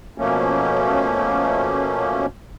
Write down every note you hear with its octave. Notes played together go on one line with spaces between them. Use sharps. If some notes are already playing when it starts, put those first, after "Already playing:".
B2 F3 A3 A#3 C#4